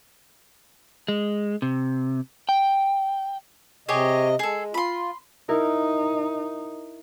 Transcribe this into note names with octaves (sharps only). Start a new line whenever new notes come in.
G#3
C3
G5
C3 G4 G#4 C#5 D#5
G#3 G#4 A4
F4 B5 C6
D#4 E4 A#4